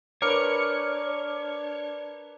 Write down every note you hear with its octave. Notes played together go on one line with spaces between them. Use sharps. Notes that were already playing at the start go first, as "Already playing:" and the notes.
D4 A#4 B4 C#5 D6 F6 C#7